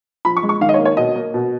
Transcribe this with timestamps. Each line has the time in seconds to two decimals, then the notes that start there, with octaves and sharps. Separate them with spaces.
0.25 F3 B5
0.37 C#6
0.43 G#3
0.49 C#6
0.61 D#3 F5
0.69 D#5
0.74 C#5
0.79 A#3
0.85 C#5
0.97 B2 D#5
1.15 A#3
1.34 B2